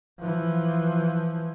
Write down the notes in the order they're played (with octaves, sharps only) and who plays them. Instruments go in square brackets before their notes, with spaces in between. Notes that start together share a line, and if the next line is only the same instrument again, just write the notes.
[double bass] E3 F3